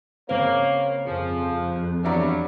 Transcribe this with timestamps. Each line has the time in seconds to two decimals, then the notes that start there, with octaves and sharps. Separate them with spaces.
0.29 C#3 A#3 C4 C#5
1.06 F2 F3 G#4
2.04 E2 G2 F#3 G3 D4 E5 A#5